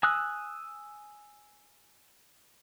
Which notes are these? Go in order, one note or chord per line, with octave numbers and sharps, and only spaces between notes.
G#5 D#6 E6 F#6